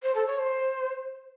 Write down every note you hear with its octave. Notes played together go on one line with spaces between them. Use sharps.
C5
A4
C#5
C5